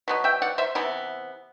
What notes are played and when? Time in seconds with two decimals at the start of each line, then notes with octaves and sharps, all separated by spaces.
0.08 B2 F#3 B3
0.24 E5 G5
0.42 D5 F#5
0.58 C5 E5
0.75 C3 E3 B3